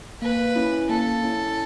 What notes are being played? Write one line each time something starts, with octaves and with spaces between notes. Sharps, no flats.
A#3 B4
C#4 E4
A#3 A4
C#4 E4